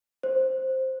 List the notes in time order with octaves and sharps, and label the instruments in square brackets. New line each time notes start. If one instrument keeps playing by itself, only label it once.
[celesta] C5